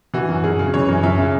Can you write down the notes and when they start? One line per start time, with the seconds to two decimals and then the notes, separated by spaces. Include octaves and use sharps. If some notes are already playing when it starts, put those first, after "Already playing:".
0.14 E3 F#4
0.29 F#2
0.44 F#2 G#4
0.59 C#3
0.74 E3 C#5
0.88 F#2
1.03 F#2 E5
1.18 C#3